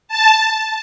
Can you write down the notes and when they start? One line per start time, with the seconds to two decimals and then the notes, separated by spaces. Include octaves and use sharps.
0.08 A5